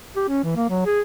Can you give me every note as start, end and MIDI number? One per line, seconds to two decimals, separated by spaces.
0.16 0.24 67
0.29 0.41 61
0.44 0.55 52
0.56 0.68 58
0.69 0.84 54
0.86 1.00 68